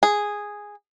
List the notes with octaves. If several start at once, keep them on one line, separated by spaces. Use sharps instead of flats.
G#4